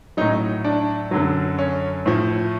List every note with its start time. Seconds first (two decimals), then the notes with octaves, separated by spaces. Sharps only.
0.17 A2 F#3 C#4 D#4
0.64 D4
1.11 F#2 D3 F#3
1.58 C#4
2.06 A2 F3